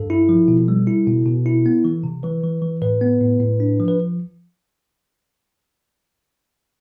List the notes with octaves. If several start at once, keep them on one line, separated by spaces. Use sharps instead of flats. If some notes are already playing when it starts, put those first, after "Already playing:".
Already playing: G2 A4
E4
F3
B2
G3
E4
B2
B2
E4
B3
E3
C3
E3 B4
E3
E3
A2 B4
B3
A2
A2
D4
F3
B4